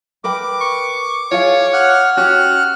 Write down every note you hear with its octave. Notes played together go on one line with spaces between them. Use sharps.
A#4 B4 G5 D6
C#6
F4 G#4 C#5 F5
F#5 F6
C#4 F#4 G4 F6 F#6